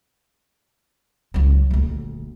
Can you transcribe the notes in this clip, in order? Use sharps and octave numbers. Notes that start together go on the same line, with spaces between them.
C#2 F#3
D#1 D2